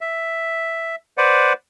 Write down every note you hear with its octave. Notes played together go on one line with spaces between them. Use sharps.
E5
B4 C5 D5 F#5